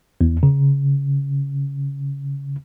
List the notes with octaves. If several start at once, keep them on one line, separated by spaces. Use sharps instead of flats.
E2
C#3